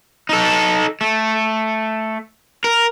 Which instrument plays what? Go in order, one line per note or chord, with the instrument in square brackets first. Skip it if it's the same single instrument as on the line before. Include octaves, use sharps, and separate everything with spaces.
[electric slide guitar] D#4 A4
A3
A#4